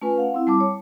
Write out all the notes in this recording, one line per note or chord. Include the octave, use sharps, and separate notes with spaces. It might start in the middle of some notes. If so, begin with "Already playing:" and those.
A3 C#4 F4 B4 G#5
F5 F#5
C4 E4
G3 A5 D6
C#5